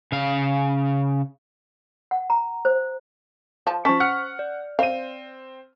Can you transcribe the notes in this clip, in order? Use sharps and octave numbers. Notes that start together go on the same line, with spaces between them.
C#3 F5
F#5
A#5
C5
F3 A5
F3 C#4 C5 A5 C#6 B6
F#5 F6 C#7
D5
C4 F5 D#7